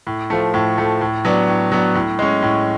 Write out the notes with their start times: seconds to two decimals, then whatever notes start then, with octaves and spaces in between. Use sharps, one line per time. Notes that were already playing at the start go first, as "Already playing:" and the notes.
0.07 A2
0.30 F3 A3
0.54 A2
0.78 F3 A3
1.01 A2
1.25 F#3 B3 D4
1.48 A2
1.72 F#3 B3 D4
1.95 A2
2.19 G#3 C#4
2.42 A2